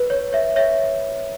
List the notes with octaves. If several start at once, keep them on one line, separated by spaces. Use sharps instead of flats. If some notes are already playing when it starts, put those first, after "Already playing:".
Already playing: B4
C#5
C#5 E5
C#5 E5